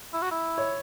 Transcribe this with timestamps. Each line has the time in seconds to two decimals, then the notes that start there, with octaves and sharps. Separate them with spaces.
0.13 E4
0.22 F#4
0.31 E4
0.58 C#5